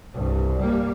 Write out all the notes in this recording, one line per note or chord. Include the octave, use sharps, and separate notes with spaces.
C2 G2
G3 A#3